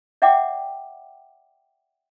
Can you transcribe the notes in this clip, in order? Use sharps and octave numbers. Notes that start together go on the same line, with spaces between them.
D5 E5 F#5 G5 D6